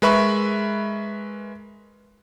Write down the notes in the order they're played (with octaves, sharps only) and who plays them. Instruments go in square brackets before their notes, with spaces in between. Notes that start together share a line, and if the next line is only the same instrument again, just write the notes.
[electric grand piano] G#3 A#4 B4 E5 B5 C#6